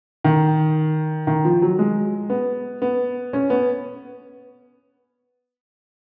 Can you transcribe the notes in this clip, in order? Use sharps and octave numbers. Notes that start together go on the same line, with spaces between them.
D#3
D#3
F3
F#3
G#3
B3
B3
C#4
B3